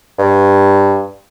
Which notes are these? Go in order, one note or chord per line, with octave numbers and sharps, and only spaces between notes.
G2